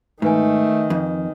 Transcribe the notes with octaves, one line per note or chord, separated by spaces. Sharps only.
G#2 D#3 A3 D#4 B4 G#5
F2